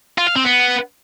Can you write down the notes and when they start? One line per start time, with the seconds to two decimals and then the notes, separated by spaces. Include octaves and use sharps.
0.18 F4
0.27 F5
0.36 C4
0.44 B3